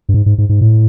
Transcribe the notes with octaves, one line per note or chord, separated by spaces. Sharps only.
G2
G#2
G#2
G#2
G#2
A2